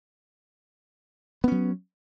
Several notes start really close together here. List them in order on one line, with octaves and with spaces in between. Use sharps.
B3 C#4 F#3